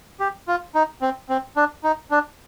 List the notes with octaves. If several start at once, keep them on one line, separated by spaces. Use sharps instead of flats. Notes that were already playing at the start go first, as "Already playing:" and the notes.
G4
F4
D#4
C4
C4
D4
D#4
D4